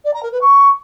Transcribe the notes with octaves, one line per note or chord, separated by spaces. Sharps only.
D5
A#5
A#4
B4
C#6